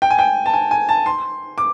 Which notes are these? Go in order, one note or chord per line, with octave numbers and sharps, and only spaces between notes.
G5
G#5
G5
A5
G#5
G#5
A5
C6
D6